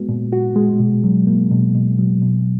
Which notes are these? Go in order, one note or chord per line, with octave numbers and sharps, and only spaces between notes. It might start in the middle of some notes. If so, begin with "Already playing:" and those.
Already playing: G#3 B3 F#4
A#2
F#4
G#3
B2
F#3
A#3
B2
B2
F#3
B2